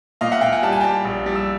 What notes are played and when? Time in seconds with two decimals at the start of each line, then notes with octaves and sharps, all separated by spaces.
0.21 A#2 D#5 F5
0.31 E5 F#5
0.41 A#2 F5 G5
0.52 F#5 G#5
0.63 G3 A5
0.72 G#5
0.81 G3 G5 A5
1.05 A#1
1.26 G3
1.36 E6